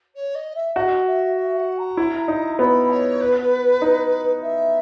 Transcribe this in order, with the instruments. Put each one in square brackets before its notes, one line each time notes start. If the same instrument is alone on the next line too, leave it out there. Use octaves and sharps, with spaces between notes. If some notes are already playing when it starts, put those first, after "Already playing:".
[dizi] C#5
D#5
E5
[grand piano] F#4 [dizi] D#5
[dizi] E5
E5
F#5
A#5
[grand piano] E4
D#4
[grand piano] B3 [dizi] B5
[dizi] C#5
B4
[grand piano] D#4
[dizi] E5